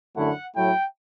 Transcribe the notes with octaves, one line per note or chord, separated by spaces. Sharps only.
F#2 D3 A3 E4 F#5
A2 F#3 A3 E4 G5